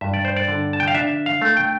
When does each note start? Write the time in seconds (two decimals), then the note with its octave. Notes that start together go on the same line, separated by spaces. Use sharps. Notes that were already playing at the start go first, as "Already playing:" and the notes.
0.01 G2 E5
0.14 D5
0.25 C5
0.36 D5
0.48 D3
0.73 A5
0.80 G5
0.88 F5
0.94 D4 E5
1.26 F5
1.42 A3
1.57 G5